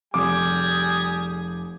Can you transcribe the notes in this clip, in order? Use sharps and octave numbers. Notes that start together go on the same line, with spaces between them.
F1 G3 G#4 G#5 D6